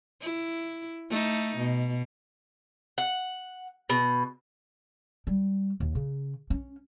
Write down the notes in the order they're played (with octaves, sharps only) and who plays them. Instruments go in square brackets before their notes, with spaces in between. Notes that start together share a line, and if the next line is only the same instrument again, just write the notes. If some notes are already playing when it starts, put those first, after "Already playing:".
[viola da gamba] E4
A3 D#4
B2
[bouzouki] F#5
B2
[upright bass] G3
D#2
C#3
C#4